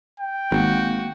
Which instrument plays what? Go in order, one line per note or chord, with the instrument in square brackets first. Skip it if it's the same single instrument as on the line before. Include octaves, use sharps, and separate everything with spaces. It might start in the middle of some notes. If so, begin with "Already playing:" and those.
[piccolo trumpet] G5
[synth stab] G#1 [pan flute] A#3 [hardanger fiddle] F#4